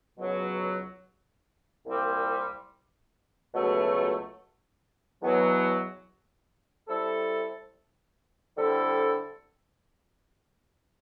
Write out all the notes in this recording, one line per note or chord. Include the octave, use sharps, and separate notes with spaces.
C#2 B2 F#3
C2 A#2 G3 C4
C#2 B2 F#3 A3
E2 B2 F#3 B3
G3 C4 E4 A4
D3 G3 C4 E4 A4